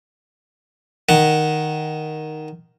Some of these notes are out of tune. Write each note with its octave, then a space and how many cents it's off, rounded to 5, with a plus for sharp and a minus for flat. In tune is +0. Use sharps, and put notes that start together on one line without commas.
D#3 +0 F#5 +0